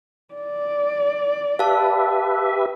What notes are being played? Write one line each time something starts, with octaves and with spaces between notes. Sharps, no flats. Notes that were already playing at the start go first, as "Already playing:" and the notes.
D5
G4 B4 E5 F5 A5